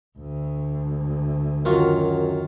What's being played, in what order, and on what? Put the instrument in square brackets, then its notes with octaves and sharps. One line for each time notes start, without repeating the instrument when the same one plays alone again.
[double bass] D2
[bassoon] F#2 [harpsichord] D#3 F4 F#4